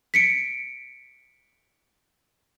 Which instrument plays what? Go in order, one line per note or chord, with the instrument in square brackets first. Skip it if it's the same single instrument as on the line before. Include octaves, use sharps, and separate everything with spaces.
[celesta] B6 C#7 D7